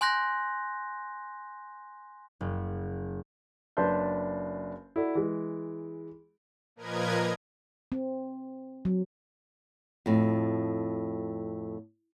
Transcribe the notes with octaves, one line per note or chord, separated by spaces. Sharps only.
G#5 C6 F#6 G6 A#6
F#1
F#1 D4 B4 A5 C6 G6
E4 F#4 A4 D5
E3 G#3
A#2 F3 A#4 B4 D#5 G#6
C4
F#3
F2 A2